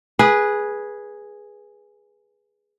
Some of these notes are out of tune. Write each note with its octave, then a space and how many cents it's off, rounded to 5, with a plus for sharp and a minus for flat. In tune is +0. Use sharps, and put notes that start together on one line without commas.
G#4 +0 B4 -15